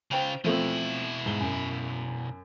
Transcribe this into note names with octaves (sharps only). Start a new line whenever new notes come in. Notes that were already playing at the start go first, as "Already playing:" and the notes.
C#3 F4 C5 G5 F7
B2 F3 A3 C4 E4
G#2 G7
F#2